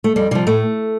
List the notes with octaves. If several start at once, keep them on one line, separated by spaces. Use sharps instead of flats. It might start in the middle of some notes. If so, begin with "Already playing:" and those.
A3
F2 G3
C3 F3 G3
A2 A3